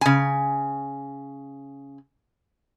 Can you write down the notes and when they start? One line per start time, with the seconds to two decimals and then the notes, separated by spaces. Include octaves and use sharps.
0.01 C#3 G#5